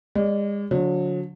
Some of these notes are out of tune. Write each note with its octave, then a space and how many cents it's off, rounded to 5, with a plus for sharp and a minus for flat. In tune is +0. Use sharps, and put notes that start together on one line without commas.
G#3 -40 D5 -20
D3 -30 F#3 -40 D5 +0